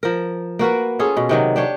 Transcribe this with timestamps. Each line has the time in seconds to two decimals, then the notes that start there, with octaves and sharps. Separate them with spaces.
0.03 F3 A#4
0.59 A#3 F#4 A#4 B4
0.99 C#4 F4 G#4 A4
1.17 B2
1.29 C3 D#3 F#3
1.56 D4 G4 C#5